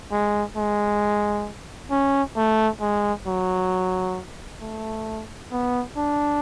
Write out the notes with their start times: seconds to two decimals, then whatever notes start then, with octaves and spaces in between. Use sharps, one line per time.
0.12 G#3
0.57 G#3
1.91 C#4
2.37 A3
2.81 G#3
3.27 F#3
4.62 A3
5.52 B3
5.97 D4